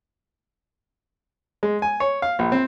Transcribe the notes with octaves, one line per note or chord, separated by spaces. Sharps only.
G#3
G#5
C#5
F5
A#1
C4